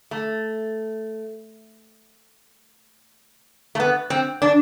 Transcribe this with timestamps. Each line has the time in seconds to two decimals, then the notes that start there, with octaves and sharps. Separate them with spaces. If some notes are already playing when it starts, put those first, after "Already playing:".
0.11 A3
3.75 A3
3.80 B3
4.10 C4
4.42 D4